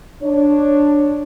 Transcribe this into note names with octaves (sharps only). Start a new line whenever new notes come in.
D4 C#5